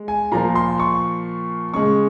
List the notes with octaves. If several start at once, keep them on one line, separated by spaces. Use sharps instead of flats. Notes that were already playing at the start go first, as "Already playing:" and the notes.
Already playing: G#3
G#5
A#2 F3 A#3 A#5
C6
C#6
C#3 G#3 C#6